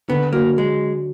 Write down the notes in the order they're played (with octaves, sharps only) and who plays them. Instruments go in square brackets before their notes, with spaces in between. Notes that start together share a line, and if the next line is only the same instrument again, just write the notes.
[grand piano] D3 [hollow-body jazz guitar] B3
[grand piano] F#3 [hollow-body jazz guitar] A#3
[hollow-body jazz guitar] G#3